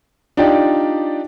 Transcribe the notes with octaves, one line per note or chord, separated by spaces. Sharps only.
D4 D#4 F4 G4 D5